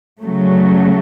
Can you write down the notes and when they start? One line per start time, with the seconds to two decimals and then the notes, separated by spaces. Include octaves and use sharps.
0.20 C#3 F#3 A3